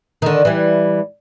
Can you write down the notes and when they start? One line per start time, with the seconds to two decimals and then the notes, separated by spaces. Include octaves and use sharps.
0.22 D3 D#3
0.45 E3 G3